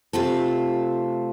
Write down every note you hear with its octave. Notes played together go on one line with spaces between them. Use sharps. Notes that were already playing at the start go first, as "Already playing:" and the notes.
C3 A3 C4 F4 A4